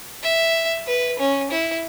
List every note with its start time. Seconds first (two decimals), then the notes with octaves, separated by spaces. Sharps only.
0.23 E5
0.87 B4
1.19 C#4
1.51 E4